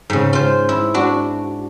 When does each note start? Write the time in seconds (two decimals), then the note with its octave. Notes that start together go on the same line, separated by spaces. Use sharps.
0.10 G#2 C#3
0.33 F4 C5
0.69 E4
0.94 D4 F#4